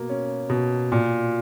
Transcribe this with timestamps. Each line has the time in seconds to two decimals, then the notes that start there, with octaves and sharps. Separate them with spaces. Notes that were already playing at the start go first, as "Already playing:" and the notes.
Already playing: B2 A#3
0.10 C#4
0.49 B2
0.92 A#2